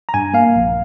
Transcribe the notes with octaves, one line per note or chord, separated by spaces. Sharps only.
A#5
G2 G#5
A#3 F5
A#1